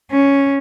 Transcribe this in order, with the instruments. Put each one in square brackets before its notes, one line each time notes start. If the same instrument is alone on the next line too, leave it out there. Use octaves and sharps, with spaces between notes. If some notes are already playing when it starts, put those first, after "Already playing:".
[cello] C#4